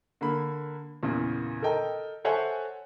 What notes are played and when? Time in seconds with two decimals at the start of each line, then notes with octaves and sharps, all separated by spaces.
0.21 D3 A#3 B5
1.03 E2 A#2 C#3
1.62 A4 A#4 D#5 G5
2.25 A4 C5 C#5 E5 F#5 G#5